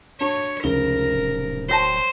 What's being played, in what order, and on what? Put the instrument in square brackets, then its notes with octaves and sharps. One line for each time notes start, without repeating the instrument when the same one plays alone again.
[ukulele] D4 F#4 [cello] C#5
[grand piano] F1 C#3 G7 [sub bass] C#2 [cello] A#4
[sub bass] D1
[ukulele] F#4 G5 A5 [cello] C5 [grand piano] C#5 A#6